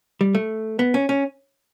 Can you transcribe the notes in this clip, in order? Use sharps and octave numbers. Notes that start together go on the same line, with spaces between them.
G3
A3
B3
C#4
C#4